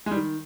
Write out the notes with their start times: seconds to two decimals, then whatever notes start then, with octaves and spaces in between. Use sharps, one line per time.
0.06 G#3
0.11 G3
0.16 D#3